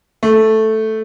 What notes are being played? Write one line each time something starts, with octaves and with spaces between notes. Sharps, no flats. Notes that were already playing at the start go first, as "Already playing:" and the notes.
A3